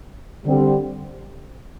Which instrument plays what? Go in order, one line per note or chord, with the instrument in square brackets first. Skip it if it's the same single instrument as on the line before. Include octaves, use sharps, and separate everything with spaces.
[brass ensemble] D3 G3 C4